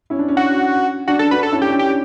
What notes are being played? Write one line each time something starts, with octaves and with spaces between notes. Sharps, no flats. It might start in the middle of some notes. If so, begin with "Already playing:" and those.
C#4 E4
D4
C#4
F#4
D4 F#4
D4 A4
D4 F#4 B4
A4
C#4 E4
D4 G4
C#4
D4 G4